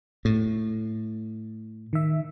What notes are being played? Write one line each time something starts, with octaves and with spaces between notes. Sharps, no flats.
A2
D#3 E5